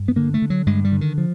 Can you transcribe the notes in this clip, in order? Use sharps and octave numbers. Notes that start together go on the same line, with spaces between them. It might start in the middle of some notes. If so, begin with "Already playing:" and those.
Already playing: G2
B3
D3 A#3
A3
D3
F#3
G2 G#3
G3
D3
D#3
F3